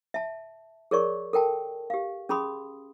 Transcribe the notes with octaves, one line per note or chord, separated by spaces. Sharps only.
E5 A5
G#4 A#4 C#5 D5 C#6
A4 A#4 G5 A5
G4 F5
C#4 G#4 B5 C6 D#6